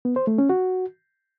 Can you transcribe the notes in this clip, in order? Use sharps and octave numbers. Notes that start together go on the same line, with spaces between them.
B3
C5
A3
C#4
F#4